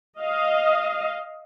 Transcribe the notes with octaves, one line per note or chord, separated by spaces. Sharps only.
D#5 F5